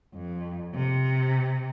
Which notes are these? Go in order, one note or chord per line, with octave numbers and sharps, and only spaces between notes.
F2
C3